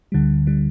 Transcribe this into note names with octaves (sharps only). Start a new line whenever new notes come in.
D2 D3 G3
D3 G3